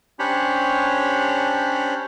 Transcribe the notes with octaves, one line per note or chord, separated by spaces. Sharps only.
C#4 D4 G4 C5 C#5 B5